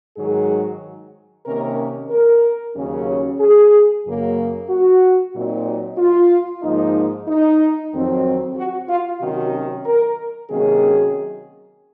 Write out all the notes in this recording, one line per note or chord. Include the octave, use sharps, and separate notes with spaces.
G#2 D#3 F#3 G#4
C3 D#3 A#3 C#4 A#4
A#4
D#2 C#3 F#3 C#4
G#4
F#2 C#3 F#3 A#3
F#4
A#2 F#3 C4 D#4
F4
G#2 F3 A#3 D#4
D#4
F2 D#3 F#3 C4
F#4
F4
C3 D#3 F#3 C#4 F#4
A#4
C3 D#3 F#3 A#3 C#4 G#4